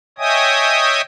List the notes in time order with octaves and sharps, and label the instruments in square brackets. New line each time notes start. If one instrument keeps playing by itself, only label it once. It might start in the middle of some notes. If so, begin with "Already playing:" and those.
[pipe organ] C#5 D#5 E5 G5 G#5 D#6